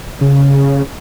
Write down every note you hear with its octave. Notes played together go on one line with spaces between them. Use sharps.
C#3